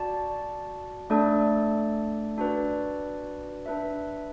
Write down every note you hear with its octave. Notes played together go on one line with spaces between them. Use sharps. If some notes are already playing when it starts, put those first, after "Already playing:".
Already playing: F#4 D5 A5
A3 D4 A4 D5
D4 F#4 B4 D5
D4 B4 E5